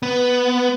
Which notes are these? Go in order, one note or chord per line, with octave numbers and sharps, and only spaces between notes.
B3